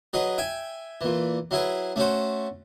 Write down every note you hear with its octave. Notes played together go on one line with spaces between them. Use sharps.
F#3 G#4 B4 D#5
E5 G5 G#5
A#2 E3
F#3 E4 G#4 B4
A3 C#4 F#4 C5